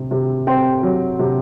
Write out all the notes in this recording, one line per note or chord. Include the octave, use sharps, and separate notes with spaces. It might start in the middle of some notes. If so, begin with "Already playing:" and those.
Already playing: C3
C3
C4 G5
F#3
C3